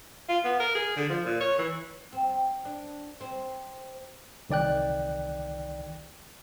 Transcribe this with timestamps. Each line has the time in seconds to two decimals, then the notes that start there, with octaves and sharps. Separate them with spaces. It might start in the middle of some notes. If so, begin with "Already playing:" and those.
0.29 F4
0.44 B3
0.60 A#4
0.75 G#4
0.96 D3
1.09 F3
1.25 A#2
1.40 C#5
1.58 E3
2.13 C4
2.65 D4
3.21 C4
4.50 C2 D#3 D5 G5 F#6